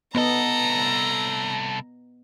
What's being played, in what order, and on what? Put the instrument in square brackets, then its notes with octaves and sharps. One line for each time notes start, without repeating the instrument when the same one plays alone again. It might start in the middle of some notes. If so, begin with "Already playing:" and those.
[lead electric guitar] C2 A4 [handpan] B3 D#5 [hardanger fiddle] A#5